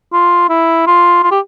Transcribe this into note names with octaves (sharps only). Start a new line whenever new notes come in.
F4
E4
F4
F4
G4